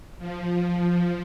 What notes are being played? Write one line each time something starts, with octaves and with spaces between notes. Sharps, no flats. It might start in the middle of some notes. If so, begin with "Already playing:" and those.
F3
F3